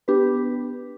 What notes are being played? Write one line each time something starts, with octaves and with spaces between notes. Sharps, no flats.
B3 D4 G4 B4